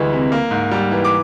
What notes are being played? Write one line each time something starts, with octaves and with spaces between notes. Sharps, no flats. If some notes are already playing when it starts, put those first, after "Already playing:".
Already playing: D2 E3 G3 G#3
C3
A#3
G#2
G3
E3
D6